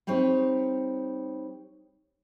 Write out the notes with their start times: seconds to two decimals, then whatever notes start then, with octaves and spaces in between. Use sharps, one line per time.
0.07 G3 C4 D#4 C#5